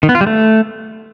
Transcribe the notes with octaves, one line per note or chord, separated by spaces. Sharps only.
D#3
B3
F4
G3
A3